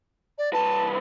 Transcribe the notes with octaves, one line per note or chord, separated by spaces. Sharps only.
D5
C2 B4 A5